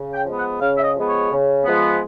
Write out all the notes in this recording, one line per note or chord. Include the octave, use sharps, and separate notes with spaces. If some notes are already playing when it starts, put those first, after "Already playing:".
Already playing: C#3
G5
F3 G#3 B3
F#5
C#3 F5
E5
D#5
F3 G#3 B3
C#5
C#3
F3 G#3 B3